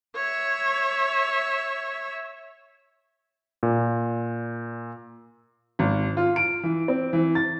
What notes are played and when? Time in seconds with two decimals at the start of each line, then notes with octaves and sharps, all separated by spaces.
0.16 C#5 E5
3.63 A#2
5.79 G#1
6.17 F4
6.36 D7
6.63 E3
6.88 C4
7.13 E3
7.35 A6